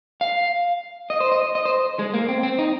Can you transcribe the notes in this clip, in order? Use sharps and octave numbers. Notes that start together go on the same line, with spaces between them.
F5
D#5
C5
D#5
D#5
C5
G#3
A#3
C4
C4
D#4